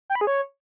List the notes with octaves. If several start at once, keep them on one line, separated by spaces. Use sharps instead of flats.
G5
B5
G#4
C#5